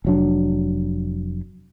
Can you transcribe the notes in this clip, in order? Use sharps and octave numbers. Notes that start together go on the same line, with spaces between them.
F1 F#3 D4